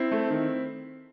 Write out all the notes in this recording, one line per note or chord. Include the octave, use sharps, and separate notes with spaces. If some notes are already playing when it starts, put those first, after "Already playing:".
Already playing: C4 E4
A3
D#3